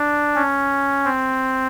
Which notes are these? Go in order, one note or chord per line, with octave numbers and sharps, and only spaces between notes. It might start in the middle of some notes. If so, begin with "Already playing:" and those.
Already playing: D4
C#4
C4